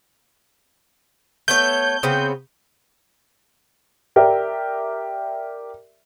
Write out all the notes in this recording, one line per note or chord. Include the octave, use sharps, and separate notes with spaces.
A3 B3 C#5 G6
C#3 B3 C4
G4 A#4 D5 E5